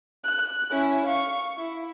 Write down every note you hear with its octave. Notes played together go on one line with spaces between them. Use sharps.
F#6
C#4 E4
F5 C#6
E4